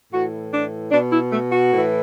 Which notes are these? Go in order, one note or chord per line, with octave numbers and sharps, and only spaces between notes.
A2 E3 F#4
D4
B2 D4
E4
A3
F#4
A2 E3